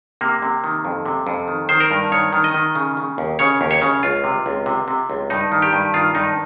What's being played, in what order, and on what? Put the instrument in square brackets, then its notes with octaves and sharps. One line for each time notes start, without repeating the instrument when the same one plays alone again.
[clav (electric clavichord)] C3 A#3
C3
D#3
F2
C3
F2
D#3
D#3 C5
A#4
G2
D#3 C#5
D#3
D#5
D#3
C#3
C#3
D#2
C#3 C#5
D#2
C#5
C#3
C#2 F4
C3
C#2
C3
C3
C#2
G2 D#4
D#3
G4
G2
D#3 F4
G2 D#4